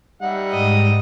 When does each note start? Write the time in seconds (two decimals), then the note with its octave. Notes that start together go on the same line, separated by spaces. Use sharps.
0.22 G3 D#4 E5 F#5
0.51 G#2 D#5